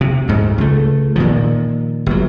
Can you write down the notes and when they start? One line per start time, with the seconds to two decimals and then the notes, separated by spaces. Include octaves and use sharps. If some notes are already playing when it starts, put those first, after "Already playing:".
0.01 C3
0.28 D2 G#2
0.58 C#2 A3
1.16 A#2 D#3 F3
2.06 G1 F#3